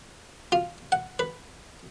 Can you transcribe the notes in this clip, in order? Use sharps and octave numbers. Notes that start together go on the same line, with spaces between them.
F4
F#5
B4